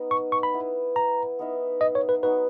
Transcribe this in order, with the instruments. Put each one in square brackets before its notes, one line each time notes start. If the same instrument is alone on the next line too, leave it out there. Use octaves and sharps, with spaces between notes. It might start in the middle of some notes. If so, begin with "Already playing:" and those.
Already playing: [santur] B3 D#4 A#4 D#5
[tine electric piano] C#6
C#6
B5
[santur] B3 E4 B4
[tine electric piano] A#5
[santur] B3 D#4 A#4 E5
[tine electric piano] D#5
C#5
B4
[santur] F#3 B3 D#4 F#4 [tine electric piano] B4